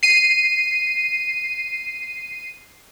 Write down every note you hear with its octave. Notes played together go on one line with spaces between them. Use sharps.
C7 D#7